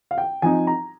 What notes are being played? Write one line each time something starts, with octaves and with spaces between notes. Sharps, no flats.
F5
G5
F3 C4 D#4 G#5
A#5